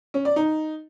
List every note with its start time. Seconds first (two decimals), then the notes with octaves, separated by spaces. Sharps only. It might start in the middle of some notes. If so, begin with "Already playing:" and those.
0.14 C#4
0.25 D5
0.36 D#4